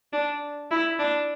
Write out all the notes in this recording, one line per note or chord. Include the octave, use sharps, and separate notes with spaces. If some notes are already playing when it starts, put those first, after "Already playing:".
D4
E4
D4